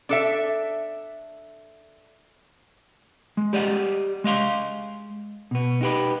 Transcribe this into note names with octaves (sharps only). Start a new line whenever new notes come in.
D4 A4 E5
G#3
G4 D5 D#5 F#5
G#3 D#5 F5 C6
B2 B3
D#4 G4 B4